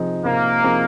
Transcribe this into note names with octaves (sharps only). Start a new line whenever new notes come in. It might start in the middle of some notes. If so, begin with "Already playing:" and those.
Already playing: C3 F3 C4 D#4 G#4
C3 A#3
F3 C4 D#4 G#4